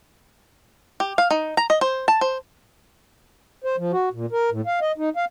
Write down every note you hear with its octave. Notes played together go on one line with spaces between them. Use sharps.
G4
F5
D#4
A#5
D#5
C5
A5
C5
C5
F3
F#4
A#2
A#4
A2
F5
D#5
D#4
F5